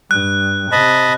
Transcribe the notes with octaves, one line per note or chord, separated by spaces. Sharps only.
G2 F#6
C3 D#5 A5 B5